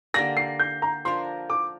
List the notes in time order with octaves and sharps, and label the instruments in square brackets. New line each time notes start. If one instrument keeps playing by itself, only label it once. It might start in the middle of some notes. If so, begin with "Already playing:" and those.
[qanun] D3 A#3 G4 D5 [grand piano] A#6
[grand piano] C7
G6
A#5
[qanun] F3 D4 A#4 [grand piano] C6
[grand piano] D6